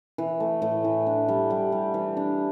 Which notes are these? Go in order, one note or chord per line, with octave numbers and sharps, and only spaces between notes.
E3
A3
A2
E3
D4
G3
G3
G3
E3
D4